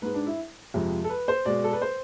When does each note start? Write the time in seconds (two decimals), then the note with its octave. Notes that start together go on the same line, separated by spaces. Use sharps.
0.02 G#2 G#3 B4
0.14 D4
0.27 E4
0.74 F2 C3 F3 G#3
1.04 A4
1.10 B4
1.28 C5
1.45 B2 G#3 D5
1.64 A4
1.73 B4
1.82 C5